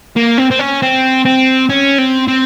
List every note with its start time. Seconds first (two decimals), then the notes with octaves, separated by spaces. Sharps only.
0.17 A#3
0.38 C4
0.51 C4
0.59 C#4
0.82 C4
1.25 C4
1.69 C#4
1.98 C4
2.28 C4